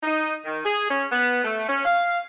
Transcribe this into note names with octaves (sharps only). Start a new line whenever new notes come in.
D#4
D#3
G#4
C#4
B3
A3
C#4
F5